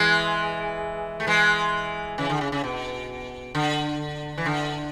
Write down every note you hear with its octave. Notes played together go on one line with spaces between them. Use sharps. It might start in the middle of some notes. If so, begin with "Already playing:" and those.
Already playing: E3 G#3
A3
E3 G#3
C#3 E3
D3
C#3
C#3
B2
D3
E3
D3